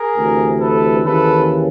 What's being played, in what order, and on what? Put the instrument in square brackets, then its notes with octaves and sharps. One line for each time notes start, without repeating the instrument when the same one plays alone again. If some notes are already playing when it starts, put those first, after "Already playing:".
Already playing: [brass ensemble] G#4 A#4
D2 C3 E3
A4 B4
D#2 C#3 E3 A4 B4